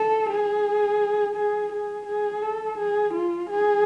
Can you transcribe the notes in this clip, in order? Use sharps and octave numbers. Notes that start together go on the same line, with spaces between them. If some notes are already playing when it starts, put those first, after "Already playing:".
Already playing: A4
G#4
G#4
G#4
G#4
A4
G#4
F4
G#4